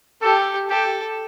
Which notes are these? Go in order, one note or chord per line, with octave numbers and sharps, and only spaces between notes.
G4 A4
G4 A4